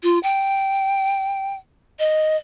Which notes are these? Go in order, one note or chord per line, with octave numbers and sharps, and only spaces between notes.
F4
G5
D#5